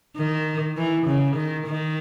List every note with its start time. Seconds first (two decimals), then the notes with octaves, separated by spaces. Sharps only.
0.17 D#3
0.77 E3
1.07 C#3
1.36 D#3
1.67 D#3